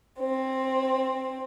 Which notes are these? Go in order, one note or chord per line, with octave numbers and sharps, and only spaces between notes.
C4